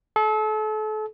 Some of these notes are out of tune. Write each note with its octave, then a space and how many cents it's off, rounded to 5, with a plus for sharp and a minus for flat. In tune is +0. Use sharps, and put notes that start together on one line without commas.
A4 -35